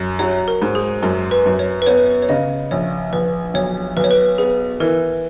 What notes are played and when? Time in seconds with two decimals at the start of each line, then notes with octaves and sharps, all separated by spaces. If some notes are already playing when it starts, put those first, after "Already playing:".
Already playing: F#2
0.19 F#3 C#5
0.48 A#4
0.62 G#2
0.75 G#4
1.03 F#2 A#4
1.31 B4
1.46 F#2
1.59 C#5
1.82 B4
1.86 B3 C#5
2.22 C#5
2.29 C#3 D#5
2.71 A#1 C#5
3.13 A#1 B4
3.54 B1 C#5
3.97 B1 B4
4.04 C#5
4.11 B4
4.38 B3 G#4
4.80 E3 A#4